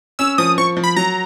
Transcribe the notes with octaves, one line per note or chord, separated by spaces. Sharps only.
C#4 E6
F3 D#6
F3 C#6
F3
B5
F#3 A#5